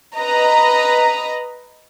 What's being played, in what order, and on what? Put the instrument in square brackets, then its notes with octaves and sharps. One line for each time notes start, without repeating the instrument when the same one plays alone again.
[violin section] B4 D#5 A#5